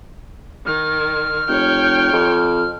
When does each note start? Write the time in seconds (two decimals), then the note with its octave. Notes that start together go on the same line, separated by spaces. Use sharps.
0.66 D#3 F6
1.49 F1 C#5 G5
2.13 F2